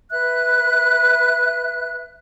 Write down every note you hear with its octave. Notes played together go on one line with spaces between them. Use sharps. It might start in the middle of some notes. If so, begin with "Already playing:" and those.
B4 E5 F#6